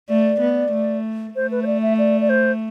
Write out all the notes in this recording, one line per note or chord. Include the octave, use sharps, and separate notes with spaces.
A3 D5
B3
A3
A3 C5
B4
C5
D5
E5
D5
D5
C5